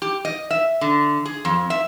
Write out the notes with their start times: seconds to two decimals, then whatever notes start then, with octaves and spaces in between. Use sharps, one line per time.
0.02 G4
0.25 D#5
0.51 E5
0.81 D3
1.25 G#4
1.45 F2
1.70 E5